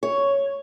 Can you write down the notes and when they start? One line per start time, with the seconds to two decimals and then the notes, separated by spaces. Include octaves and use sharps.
0.03 C#5